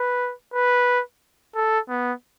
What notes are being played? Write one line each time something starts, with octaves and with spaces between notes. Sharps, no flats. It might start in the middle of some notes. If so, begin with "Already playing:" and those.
Already playing: B4
B4
A4
B3